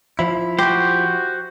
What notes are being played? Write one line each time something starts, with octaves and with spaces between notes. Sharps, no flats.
F3 E4
F#4 G4 C5 G6